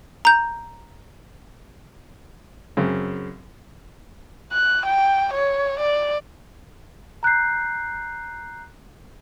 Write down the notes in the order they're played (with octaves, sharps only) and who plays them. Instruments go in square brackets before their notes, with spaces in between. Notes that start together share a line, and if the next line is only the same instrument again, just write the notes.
[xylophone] A#5 G6
[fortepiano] F#2 C#3 C4
[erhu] F#6
G5
C#5
D5
[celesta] A#5 F#6 G6 C7